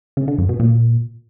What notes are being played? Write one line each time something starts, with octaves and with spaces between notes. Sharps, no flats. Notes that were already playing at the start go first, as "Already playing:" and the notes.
C#3
D3
F#2
B2
A#2